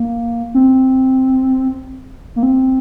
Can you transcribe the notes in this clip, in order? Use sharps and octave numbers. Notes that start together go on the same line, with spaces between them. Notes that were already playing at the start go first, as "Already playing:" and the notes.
Already playing: A#3
C4
A#3
C4